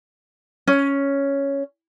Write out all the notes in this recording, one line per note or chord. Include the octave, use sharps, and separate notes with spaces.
C#4